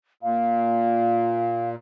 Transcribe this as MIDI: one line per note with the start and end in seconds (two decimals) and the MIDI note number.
0.23 1.75 46
0.23 1.69 77